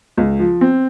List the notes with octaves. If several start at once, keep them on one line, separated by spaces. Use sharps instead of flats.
C#2
F3
C4